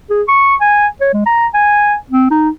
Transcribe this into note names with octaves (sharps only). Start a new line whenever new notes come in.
G#4
C#6
G#5
C#5
G#3
A#5
G#5
C4
D#4